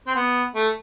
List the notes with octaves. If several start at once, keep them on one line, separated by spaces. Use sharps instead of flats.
C4
B3
A3